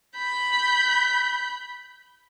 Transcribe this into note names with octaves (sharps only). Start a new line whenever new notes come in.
B5 G6